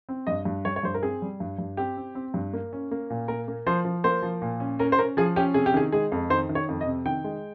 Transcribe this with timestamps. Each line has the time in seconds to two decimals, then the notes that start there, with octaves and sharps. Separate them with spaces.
0.09 C4
0.27 G2 D#5
0.45 G2
0.65 G3 C#5
0.76 C#5
0.83 G2 C5
0.94 A#4
1.03 C4 G#4
1.22 G3
1.40 G2
1.58 G2
1.77 C4 G4
1.97 C4
2.15 C4
2.34 G2
2.53 A#3
2.73 C#4
2.91 A#3
3.10 A#2
3.28 A#3 A#4
3.48 A#3
3.66 F3 C5
3.85 F3
4.04 A#3 C5
4.22 F3
4.42 A#2
4.60 C#4
4.79 C#4 A#4
4.92 C5
4.99 C#4 A#4
5.17 F3 G#4
5.36 C#4 G4
5.54 C3 G#4
5.66 G4
5.74 D#3 G#4
5.92 G#3 G#4
6.12 F2
6.30 D#3 C5
6.49 D#3
6.55 C#5
6.69 F2
6.81 D#5
6.86 C3
7.06 D#3 G5
7.24 G#3